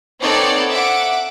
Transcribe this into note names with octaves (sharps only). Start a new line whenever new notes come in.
B3 C4 D#4 A4 C#5 D5
E5 F#5 D6